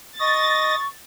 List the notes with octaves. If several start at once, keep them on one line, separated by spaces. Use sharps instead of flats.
D#5 C#6 A6 A#6